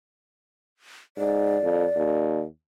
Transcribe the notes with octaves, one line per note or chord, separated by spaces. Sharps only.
G#2 D5
F2
D#2